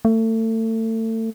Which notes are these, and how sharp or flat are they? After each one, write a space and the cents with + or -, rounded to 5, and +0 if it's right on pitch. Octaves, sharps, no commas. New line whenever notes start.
A3 +30